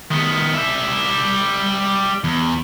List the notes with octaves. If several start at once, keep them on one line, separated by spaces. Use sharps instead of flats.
D#3 B3
G3 E5
E2